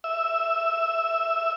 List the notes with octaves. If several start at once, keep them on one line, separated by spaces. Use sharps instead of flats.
E5